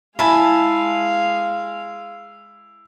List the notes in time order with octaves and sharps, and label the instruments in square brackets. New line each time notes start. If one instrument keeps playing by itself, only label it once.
[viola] G#3 F5 [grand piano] E4 [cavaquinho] G#5 A5 B5